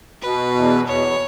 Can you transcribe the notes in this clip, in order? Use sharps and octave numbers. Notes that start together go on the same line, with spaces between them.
B2 B4
E2
E2 C#5